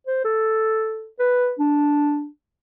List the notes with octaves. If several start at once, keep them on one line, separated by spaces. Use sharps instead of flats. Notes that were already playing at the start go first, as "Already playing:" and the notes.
C5
A4
B4
D4